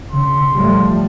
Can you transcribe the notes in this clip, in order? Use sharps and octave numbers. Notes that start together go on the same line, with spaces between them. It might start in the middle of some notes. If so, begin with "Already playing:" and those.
C#3 C6
A2 F3 G3 A3